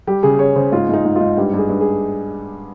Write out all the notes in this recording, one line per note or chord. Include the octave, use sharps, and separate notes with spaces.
G3 G4
C#3 G#4
C#3 C#5
C#3 C5
G#2 F4
G#2 D#4
G#2
G#2 F4
G2 G4
G2 G#4
G2
G#4